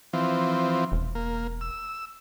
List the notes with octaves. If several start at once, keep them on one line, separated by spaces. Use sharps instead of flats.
E3 F3 C4
E1
A#3
E6